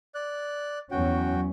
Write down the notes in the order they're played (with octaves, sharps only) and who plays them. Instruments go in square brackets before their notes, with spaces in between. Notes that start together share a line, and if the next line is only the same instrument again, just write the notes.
[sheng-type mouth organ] D5 F#6
[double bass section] E2 F#3 C#4 [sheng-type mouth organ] F#4 G5